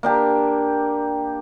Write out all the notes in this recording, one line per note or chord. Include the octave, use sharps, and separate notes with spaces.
A#3 D4 G4